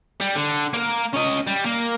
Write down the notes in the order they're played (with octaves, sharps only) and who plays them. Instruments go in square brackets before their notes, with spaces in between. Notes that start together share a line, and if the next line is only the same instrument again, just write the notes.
[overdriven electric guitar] G3
D3
A#3 A#4
C#4 D#5
G3
A#3